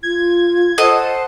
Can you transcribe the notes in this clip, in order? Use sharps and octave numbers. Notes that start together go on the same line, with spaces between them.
F4 G#6
A4 C5 D#5 F#5 A5